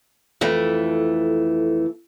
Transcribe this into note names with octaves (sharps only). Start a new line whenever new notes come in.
F2 E3 A3